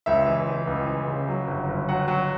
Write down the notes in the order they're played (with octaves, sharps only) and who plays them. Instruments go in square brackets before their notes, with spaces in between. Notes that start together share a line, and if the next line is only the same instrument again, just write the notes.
[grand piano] C#2 E5
E3
E3
C#2
E3
C#3
F#3
G1
G1
F#3 F#5
F#3